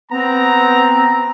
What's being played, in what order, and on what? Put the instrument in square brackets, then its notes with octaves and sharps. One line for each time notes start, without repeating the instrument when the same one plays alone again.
[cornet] B3 [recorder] C4 [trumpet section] A#5